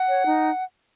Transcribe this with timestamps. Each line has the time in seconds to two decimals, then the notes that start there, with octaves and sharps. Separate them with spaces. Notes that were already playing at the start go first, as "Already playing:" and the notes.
Already playing: F#5
0.09 C#5
0.25 D#4